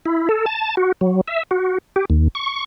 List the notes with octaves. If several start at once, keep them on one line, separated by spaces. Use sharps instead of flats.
E4
A4
A5
F#4
F#3
E5
F#4
G4
D#2
C#6